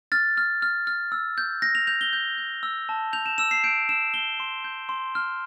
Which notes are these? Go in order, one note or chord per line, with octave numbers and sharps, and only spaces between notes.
F6 A6
F6
F6
F6
E6
G6
G6 A#6
F7
G6 F7
G7
G6
G6
E6
A5
G6 F7
E7
E6 E7
C7
G6 D7
E6 E7
E6 G7
C6
G6
C6
F6